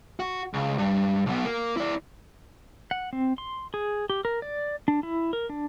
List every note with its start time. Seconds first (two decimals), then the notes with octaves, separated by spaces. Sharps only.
0.20 F#4
0.54 C#2
0.78 G2
1.26 B1 B2
1.45 A#3
1.77 E4 D5
2.91 F#5
3.13 C4
3.38 C6
3.74 G#4
4.10 G4
4.25 A#4
4.42 D5
4.88 D4
5.03 E4
5.33 A#4
5.50 D4